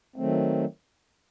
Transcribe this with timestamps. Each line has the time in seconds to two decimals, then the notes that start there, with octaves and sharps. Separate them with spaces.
0.16 D#3 F#3 A3 C4